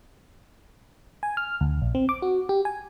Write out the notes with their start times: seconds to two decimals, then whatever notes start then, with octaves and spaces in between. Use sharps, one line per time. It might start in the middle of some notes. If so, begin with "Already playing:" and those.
1.23 G#5
1.37 F6
1.61 D2
1.82 A#1
1.95 C4
2.09 D6
2.22 F#4
2.49 G4
2.65 G#5